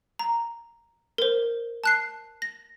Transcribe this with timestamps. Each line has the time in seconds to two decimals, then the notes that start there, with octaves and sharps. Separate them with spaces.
0.19 A#5
1.18 A#4 C5
1.84 A5 F#6 C7
2.42 A#6